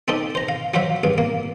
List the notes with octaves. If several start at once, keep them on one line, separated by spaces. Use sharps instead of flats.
C4 D4 D#4 A4
C5 A#5
F5
F#3 F#4 C5 E5 F5
C2 G2 F5
A#3